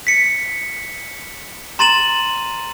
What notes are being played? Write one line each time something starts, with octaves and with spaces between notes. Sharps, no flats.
B6 C#7
A#5 C6 A6 D#7 E7 F#7